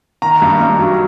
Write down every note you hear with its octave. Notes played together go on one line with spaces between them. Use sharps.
D#3 A#5
G2
G2
F#3